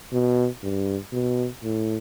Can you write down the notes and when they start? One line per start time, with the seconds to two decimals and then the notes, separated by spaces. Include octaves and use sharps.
0.13 B2
0.63 G2
1.13 B2
1.63 A2